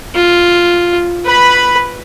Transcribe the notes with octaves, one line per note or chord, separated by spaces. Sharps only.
F4
B4 B5